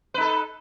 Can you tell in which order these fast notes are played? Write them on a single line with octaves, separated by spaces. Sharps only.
B4 D#4 A4